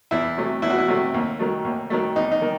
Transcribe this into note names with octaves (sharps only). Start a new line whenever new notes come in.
E2 E4
C3 F#3 A3
E2 E4
F#4
E4
C3 F#3 A3
D#2
D#3 F#3 A3
D#2
D#3 F#3 A3
E2 D#4
D#4
D#3